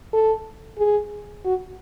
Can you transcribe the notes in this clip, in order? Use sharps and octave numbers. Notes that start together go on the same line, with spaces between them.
A4
G#4
F#4